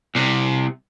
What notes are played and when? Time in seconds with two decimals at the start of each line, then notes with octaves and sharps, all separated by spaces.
0.15 C2 C3